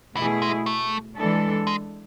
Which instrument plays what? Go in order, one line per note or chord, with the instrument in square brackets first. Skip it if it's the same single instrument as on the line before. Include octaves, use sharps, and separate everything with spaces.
[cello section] B2 A3 E4 G#4 [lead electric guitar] E3
[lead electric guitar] G#3
A3
[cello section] E3 G#3 D4 A4
[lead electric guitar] G#3